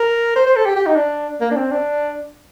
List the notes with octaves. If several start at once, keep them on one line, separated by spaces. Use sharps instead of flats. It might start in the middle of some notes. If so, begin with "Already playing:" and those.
Already playing: A#4
C5
C5
A4
G4
G4
D#4
D4
A#3
D4
C4
D4